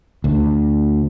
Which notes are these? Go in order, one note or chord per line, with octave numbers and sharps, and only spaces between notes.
D2